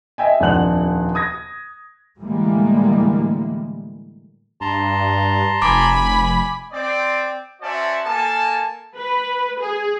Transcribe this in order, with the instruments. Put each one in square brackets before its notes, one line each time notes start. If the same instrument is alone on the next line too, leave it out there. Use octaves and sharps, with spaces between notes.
[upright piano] D#5 E5 G5 G#5
D#1 F2 D4 F#5 F#6 F#7
D#6 G#6 A#6
[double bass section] A2 D3 E3 G3 G#3 A#3
[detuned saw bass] G2 [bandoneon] A5 A#5 C6
[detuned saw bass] F1 [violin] G#5 B5 [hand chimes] D6
[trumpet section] C4 D5
C#4 F#4 C5 D5 E5 A5
A#3 A4 G#5 A5
[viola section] B4
G#4